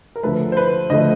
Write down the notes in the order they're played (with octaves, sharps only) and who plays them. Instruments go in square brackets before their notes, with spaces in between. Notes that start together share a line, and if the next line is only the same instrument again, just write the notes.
[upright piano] A#4
D2 D3 F3 A3 B4
C5
B4
D2 D3 F3 A3 D#5